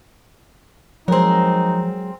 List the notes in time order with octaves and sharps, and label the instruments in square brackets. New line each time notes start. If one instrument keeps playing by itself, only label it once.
[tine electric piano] F3 [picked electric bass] F#3 G#3 [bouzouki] C4 A#4 [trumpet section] D#4 A#5